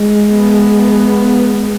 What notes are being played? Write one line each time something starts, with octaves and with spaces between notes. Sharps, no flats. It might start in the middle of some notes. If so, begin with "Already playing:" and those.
Already playing: G#3
B3